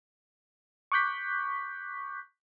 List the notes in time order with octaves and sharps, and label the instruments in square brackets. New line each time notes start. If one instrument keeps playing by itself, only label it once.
[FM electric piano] C#6 D6 F#6 G6 B6